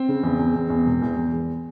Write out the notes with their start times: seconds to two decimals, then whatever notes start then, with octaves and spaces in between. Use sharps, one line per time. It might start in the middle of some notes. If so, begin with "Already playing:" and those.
Already playing: C4
0.09 C#3
0.23 E2
0.39 E2
0.55 E2
0.70 E2
0.86 E1
1.02 E2
1.17 E2
1.32 E2